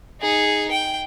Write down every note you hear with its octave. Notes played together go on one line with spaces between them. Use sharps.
D#4 G#4
G5